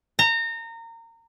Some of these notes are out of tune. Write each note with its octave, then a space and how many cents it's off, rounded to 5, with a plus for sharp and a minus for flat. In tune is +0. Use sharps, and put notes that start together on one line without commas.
A#5 -25